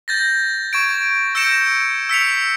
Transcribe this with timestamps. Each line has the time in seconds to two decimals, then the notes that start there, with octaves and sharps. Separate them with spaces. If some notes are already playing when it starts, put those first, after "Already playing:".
0.08 G6 A6 A#6
0.73 C#6 G#6 D7
1.35 E6 G6 A#6 C#7 D7 E7
2.09 E6 B6 C#7 F7